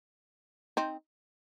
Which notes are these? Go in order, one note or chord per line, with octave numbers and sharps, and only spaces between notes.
C4 D#4